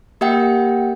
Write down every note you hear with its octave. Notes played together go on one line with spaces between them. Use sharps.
A#3 G4 E5 F#5 G5